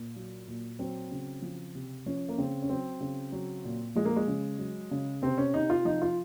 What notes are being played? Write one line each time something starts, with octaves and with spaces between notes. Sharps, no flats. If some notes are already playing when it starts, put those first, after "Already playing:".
Already playing: A#2
F#3
A#2
F#3 C4
C#3
F3
C3
F3 C#4
A#3
C#3 C4
C#4
F#3 C4
C#3
F#3
A#2
F3 G#3
A#3
G#3
C#3
F#3
C#3
C3 C4
C#4
C3 D#4
F4
F3 D#4
F4